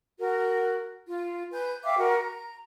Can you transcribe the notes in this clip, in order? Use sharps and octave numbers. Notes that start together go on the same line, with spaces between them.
F#4 A#4
F4
B4 G#5 G6
E5 F5 G5 D6
F#4 A#4
A#5